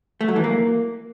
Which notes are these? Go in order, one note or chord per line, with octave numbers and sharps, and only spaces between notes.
A3
F#3
E3
A#3